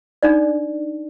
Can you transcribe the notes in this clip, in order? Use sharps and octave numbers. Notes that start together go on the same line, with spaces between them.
D4 D#4 D5